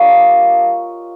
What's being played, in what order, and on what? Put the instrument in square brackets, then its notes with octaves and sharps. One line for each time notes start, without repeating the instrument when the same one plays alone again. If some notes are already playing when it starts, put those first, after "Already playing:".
Already playing: [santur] G3 A#3 D4 F4 C#5 D#5